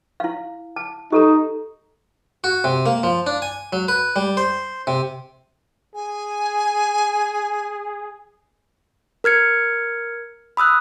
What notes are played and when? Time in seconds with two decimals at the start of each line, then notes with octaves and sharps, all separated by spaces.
0.20 E4 F5
0.76 A5
1.12 D#4 G4 A4 A#5
2.44 F#4
2.64 C3
2.86 A#3
3.03 F3
3.27 D4
3.42 G#5
3.73 F#3
3.88 B4
4.16 G3
4.37 C5
4.87 C3
5.95 G#4 G#5
9.24 A#4 F6 G#6 C#7
10.57 B5 D#6 E6 F#6